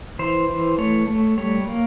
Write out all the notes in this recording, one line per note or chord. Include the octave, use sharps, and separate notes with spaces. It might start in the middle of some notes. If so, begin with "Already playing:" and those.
E3 C5
E3
A3 C#5
A3
G3 C#5
A#3